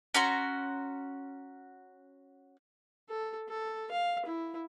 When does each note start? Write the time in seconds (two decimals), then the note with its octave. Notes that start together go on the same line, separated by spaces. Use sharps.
0.14 C#4 F#4 A#5 C6
3.09 A4
3.49 A4
3.91 F5
4.25 E4